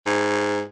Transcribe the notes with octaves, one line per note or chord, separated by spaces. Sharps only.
G#2